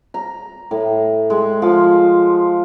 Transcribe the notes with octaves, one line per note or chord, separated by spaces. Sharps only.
A#5
A2
G#3
F3